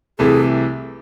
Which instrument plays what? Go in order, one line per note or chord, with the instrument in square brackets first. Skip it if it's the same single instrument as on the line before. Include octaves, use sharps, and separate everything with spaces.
[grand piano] C2 C3 E3 A3 [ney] G#4